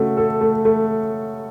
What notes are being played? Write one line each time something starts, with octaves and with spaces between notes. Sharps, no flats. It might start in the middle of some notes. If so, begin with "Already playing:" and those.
Already playing: C#3 A3 F#4
A4
A3
A3